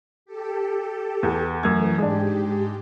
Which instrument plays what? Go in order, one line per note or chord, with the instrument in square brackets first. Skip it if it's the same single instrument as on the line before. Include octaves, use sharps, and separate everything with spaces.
[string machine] G4 A4
[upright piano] E2
[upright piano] F#2 G#6 [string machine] E3 A3
[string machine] G#2 G4 [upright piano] G#3 D4